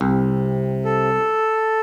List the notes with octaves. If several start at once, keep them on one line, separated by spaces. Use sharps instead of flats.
C2 C3
A4